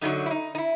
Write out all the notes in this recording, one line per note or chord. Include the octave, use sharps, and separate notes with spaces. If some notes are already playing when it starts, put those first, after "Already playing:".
F#2 D3 F#3 D#4
E4
D#4
D#4
E4